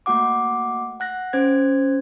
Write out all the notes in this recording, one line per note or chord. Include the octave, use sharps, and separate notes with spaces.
A3 A#3 F#4 F#5 D6
F#5 F#6 A#6
C#4 C5 G#6